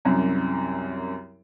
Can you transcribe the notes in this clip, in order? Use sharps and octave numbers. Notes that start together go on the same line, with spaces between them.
C2 F#2